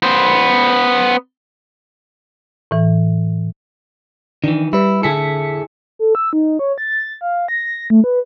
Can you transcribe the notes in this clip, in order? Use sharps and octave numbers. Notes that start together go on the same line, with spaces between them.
B3 C5
A2 E3
D#3 E3 D4
G3 E4 B4
D3 E4 G#4 A4 B6 C#7
A4
E6
D#4
C#5
A6
F5
A#6
A3
B4